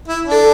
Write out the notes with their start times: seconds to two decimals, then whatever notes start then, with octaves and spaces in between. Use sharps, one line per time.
0.08 E4
0.26 D4
0.32 A4